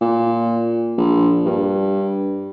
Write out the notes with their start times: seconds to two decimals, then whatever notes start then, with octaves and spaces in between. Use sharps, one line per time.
0.01 A#2
0.98 A#1
1.45 G2